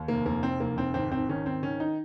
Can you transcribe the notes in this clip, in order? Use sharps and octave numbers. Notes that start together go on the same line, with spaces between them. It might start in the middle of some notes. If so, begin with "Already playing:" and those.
Already playing: D#2
F1 A#3
F1 A#3
F1 C4
F1 A#3
F1 C4
G#1 C4
G#1 C4
D#3 C#4
G#1 C4
D#3 C#4
D#4